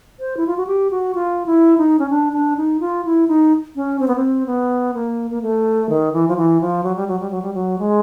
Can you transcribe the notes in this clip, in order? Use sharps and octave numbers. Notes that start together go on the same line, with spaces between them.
C5
E4
F4
F#4
G4
F#4
F4
E4
D#4
C#4
D4
D4
D#4
F4
E4
D#4
C#4
C4
B3
C4
B3
A#3
A#3
A3
D#3
E3
F3
E3
F3
F#3
G3
F#3
G3
F#3
G3
F#3
G#3